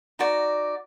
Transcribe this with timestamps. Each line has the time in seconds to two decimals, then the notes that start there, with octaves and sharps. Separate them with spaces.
0.19 D#4 F#4 D5